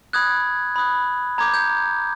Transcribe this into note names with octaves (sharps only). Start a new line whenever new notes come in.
B5 D#6 F#6 G#6
B5 D#6 F#6
A#5 D6 G6 G#6
G6